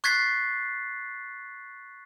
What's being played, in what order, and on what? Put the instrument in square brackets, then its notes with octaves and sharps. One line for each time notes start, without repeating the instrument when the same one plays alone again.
[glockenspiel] C#6 F#6 G#6 A6 B6 C7